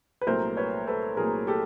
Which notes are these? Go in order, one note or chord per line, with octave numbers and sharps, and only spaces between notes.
B4
C2 A#2 F#3 A3 A#4 C5
B4 C#5
A4 B4
C2 A#2 F#3 A3 G#4 A#4
G4 A4